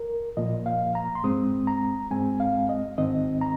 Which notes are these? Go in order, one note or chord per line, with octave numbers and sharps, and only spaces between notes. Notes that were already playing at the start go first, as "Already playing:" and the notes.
Already playing: A#4
A#2 F3 A#3 D#5
F5
A#5
C6
G#2 G#3 C4 D#6
A#5
G#2 G#3 C4 G#5
F5
D#5
G#2 D#3 C4 D#5
A#5